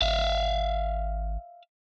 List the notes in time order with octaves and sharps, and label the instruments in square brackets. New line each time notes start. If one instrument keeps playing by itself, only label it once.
[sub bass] G#1 [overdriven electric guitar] E5 F5